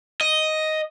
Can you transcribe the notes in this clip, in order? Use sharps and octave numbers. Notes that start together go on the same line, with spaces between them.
D#5